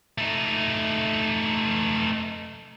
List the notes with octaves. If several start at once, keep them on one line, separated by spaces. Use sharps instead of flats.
A3 D#4